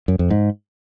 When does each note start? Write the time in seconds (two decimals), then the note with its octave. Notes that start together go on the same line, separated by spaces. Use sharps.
0.08 F#2
0.19 F2
0.30 G#2